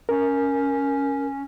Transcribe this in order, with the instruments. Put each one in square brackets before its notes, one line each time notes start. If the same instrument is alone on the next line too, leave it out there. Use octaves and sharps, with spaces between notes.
[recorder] C#4 [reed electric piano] A#4